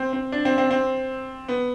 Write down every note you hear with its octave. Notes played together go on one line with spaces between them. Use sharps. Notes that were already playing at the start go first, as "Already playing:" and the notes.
Already playing: C4
C4
D4
C4
C4
C4
B3